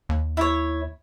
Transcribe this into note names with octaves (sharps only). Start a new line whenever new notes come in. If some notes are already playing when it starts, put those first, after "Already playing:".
D#2
E4 C#5